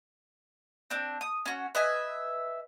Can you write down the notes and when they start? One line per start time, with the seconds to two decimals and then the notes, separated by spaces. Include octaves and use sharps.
0.90 C4 D4
1.21 D#6
1.46 C#4 F#4
1.75 B4 D#5 E5 G#5